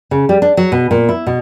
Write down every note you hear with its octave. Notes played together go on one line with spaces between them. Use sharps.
C#3
G3
D4
F#3
B2
A#2
E4
B2